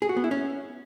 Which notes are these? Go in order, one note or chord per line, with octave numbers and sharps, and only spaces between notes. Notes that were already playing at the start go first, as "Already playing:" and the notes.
G#4
F#4
B3
E4
C#4